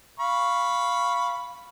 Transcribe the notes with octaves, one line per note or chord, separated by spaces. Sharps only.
F5 B5 C#6